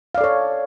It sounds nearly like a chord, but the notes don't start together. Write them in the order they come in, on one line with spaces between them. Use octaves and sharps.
F5 D5 A4 C#5